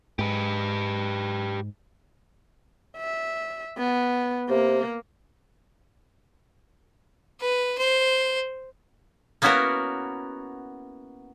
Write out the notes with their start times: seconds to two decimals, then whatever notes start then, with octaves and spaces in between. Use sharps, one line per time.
0.19 G#2 G4 B4
2.97 E5
3.78 B3
4.50 C3 A#3
7.40 B4
7.78 C5
9.42 A#3 B3 C#4 E4 F#4 A#4